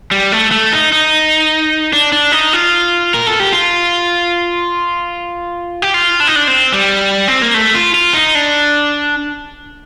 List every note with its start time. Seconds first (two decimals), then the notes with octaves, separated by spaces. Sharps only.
0.11 G3
0.32 A3
0.51 A3
0.72 D#4
0.92 D#4
1.93 D4
2.13 D4
2.32 D#4
2.53 F4
3.14 A#4
3.27 A4
3.40 G4
3.53 F4
5.82 G4
5.94 F4
6.20 D4
6.27 D#4
6.36 D4
6.48 C4
6.73 G3
7.28 C4
7.42 A#3
7.54 A3
7.75 F4
7.94 F4
8.14 D#4
8.35 D4